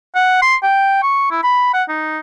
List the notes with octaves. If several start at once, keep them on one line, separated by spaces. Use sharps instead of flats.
F#5
C6
G5
C#6
E4
B5
F#5
D#4